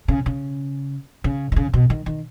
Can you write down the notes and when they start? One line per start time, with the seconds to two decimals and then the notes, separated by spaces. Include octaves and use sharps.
0.08 C#3
0.26 C#3
1.24 C#3
1.52 D#3
1.56 C#3
1.73 B2
1.90 D#3
2.06 D#3